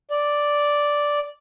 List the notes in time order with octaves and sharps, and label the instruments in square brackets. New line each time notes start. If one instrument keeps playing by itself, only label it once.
[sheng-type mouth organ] D5